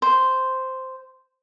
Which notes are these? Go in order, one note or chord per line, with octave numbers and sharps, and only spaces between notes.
C5